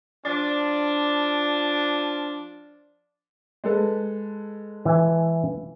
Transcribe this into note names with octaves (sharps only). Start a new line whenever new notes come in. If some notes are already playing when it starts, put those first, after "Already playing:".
F3 D4
G#3 A4 B4
E3 G#5